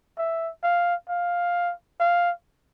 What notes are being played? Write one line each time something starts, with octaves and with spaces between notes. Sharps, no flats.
E5
F5
F5
F5